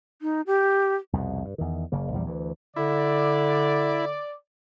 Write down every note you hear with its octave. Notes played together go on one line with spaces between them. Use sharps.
D#4
G4
C2 F2 B2
G2
E2 D#3
F#1 C#3 A#3
A#1 E2 G3
D2 E3
D3 E4 D5